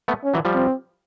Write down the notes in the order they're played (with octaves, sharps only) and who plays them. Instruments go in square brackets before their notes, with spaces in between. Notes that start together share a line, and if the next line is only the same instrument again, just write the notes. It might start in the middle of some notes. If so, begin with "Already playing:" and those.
[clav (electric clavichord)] A3 B3
[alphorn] C#4
[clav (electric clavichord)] E3 F#3
F3 G3
[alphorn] C4